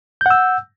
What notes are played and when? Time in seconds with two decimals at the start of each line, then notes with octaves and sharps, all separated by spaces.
0.21 G6
0.26 F#5
0.31 E6